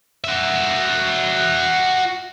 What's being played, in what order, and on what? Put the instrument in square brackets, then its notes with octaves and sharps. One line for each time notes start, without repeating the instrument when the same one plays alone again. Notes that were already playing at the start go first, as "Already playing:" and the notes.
[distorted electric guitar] F#4 E5